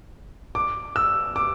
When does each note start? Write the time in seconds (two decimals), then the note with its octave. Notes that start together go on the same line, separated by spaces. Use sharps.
0.55 D6
0.96 E6
1.36 D6